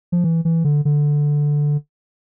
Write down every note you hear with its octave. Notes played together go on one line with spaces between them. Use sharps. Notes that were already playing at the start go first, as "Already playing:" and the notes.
F3
E3
E3
D3
D3